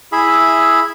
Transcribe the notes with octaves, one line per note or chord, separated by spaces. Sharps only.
E4 G#4 E5 B5